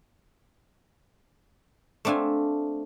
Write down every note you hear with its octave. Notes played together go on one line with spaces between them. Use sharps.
A3 C4 D4 F5 G#5